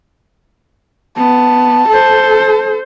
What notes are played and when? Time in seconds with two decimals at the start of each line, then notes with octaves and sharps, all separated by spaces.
1.17 B3 A5
1.89 A4 C5